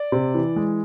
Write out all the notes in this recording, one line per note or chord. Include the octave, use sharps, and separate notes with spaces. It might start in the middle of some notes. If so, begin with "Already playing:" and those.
Already playing: D5
C3
E3
G#3